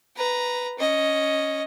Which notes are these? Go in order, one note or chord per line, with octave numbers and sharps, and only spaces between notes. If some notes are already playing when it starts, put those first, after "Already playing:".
B4 A#5
C#4 D#5